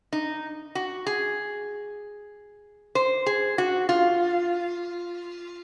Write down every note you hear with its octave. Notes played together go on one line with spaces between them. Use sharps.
D#4
F#4
G#4
C5
G#4
F#4
F4